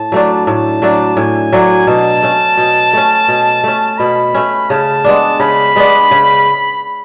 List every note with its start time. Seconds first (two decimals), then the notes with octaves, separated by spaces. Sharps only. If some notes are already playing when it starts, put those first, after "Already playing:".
Already playing: A2 A5
0.12 F#3 A3 D4
0.46 A2 A5
0.82 F#3 A3 D4
1.17 A2 G#5
1.53 F#3 A3 D4
1.87 B2 A5
2.23 A3 C#4
2.57 B2
2.93 A3 C#4
3.28 B2
3.64 A3 C#4
3.99 B2 B5
4.34 A3 C#4
4.70 C#3 A5
5.04 G#3 B3 D4
5.40 C#3 B5
5.76 G#3 B3 D4
6.11 C#3